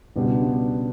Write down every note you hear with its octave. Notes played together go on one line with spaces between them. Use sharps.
C#2 B2 G3 B3 D4